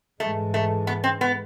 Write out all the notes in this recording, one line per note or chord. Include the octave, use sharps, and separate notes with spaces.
G#2 E3 G#3 A3
A3
B3
C4
B3